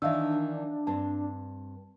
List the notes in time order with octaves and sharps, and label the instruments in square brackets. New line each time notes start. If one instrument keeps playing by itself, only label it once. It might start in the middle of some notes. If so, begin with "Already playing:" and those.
[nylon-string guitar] D#3 E3 [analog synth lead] D4 [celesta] E5 F5 E6
[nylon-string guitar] G2 C4 [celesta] A5